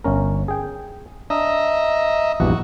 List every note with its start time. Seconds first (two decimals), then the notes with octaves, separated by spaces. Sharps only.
0.04 G1 C#4 A#4
0.48 G#4 G5
1.30 D4 D#5 E5 A#5
2.40 A#1 E2 G2 F#4